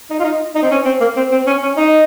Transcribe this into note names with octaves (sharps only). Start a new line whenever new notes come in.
D#4
F4
D#4
D#4
C4
C#4
C4
A#3
C4
C4
C#4
C#4
D#4